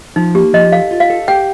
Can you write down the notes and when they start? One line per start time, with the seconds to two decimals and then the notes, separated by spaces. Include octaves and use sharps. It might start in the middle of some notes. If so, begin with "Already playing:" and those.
0.16 F3 D#4
0.35 A#3 G4
0.53 F3 D#5
0.72 A4 F5
0.91 F4
1.00 F5
1.10 A4
1.28 G4 G5